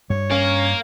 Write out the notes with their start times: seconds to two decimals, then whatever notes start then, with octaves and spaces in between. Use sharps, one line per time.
0.10 G2 G3 C#5
0.31 C#4 A#4 F5